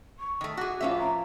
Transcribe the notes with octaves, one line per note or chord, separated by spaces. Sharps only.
C#6
D#3 A3
F#4 G#4 D6
A2 F3 B3 C#4 F4 E5
A#5